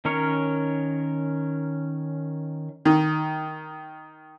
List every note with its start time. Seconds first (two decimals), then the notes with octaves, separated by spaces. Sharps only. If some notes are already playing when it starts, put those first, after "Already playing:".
0.05 D#3 C#4 A#4 C#5
2.85 D#3